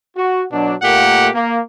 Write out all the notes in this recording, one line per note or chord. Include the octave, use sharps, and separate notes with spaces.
F#4
B2 F#3 D4
A#2 A3 A#3 G4 F#5
A#3